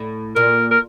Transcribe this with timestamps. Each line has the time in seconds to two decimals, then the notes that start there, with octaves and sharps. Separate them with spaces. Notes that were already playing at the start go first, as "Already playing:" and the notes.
Already playing: A2
0.36 A#2 A#4
0.71 A#4